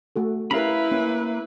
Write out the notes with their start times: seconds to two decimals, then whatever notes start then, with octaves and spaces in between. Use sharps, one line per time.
0.16 A3 F#4 A4
0.51 C#4 E4 G4 A#4 B4 F5 A#5 B5
0.91 A#3 C#4